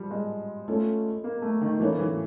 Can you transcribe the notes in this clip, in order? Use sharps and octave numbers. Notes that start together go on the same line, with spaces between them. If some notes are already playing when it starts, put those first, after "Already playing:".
Already playing: F3 G3
G#3
A3 C#4 F4 A4
A#3
A3
D#3
E3 A#3 C#4 E4 A4 C#5
E3